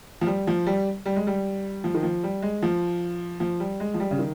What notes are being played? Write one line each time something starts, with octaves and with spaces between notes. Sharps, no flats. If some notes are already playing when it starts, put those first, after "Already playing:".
F3
G3
F3
G3
G3
G#3
G3
F3
D#3
F3
G3
G#3
F3
F3
G3
G#3
F3
G3
C#3
D#3